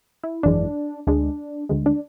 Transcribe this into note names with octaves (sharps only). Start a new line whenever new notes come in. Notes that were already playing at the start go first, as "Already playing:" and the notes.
E4
G#1 F#2 E3 G#3 D4
D2 D3 G#3 D4
D2 D3 G#3
D4